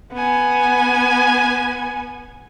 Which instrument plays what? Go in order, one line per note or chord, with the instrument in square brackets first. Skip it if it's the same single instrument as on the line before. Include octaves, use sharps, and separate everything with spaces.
[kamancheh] B3 G#5